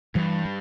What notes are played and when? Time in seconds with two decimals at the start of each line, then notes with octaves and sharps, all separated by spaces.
0.15 G2 E3 G3
0.45 G3